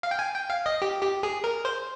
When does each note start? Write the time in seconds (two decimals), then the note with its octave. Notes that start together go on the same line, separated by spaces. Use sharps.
0.03 F5
0.11 G5
0.19 G#5
0.34 G5
0.50 F5
0.66 D#5
0.82 G4
1.03 G4
1.23 G#4
1.44 A#4
1.65 C5